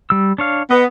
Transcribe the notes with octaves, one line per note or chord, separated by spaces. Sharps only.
G3 E6
D4 C#5 F5
B3 D#5